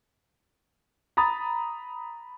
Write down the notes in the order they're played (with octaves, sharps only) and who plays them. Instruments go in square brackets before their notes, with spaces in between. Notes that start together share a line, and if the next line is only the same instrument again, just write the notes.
[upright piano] A#5 B5 D#6 A6